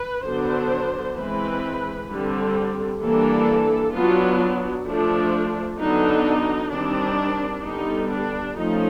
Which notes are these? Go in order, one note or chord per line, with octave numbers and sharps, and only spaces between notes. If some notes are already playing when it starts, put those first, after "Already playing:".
Already playing: B4
D3 F#3 B3 D4 C5
E3 G#3 C4 B4
D3 G3 C4
E3 G3 A#3 D4 A4
F#3 B3 D4 F4
F3 A3 D4
D3 F#3 B3 D4 D#4
D#3 G3 C4 D4
D3 G3 B3 D#4
D4
F3 A3 C#4 D#4